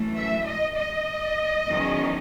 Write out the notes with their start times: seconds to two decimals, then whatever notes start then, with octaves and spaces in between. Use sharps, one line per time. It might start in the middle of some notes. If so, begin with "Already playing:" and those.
Already playing: F#2 E3 A3
0.17 E5
0.47 D#5
0.77 D#5
1.67 E2 D#3 F#3 C#4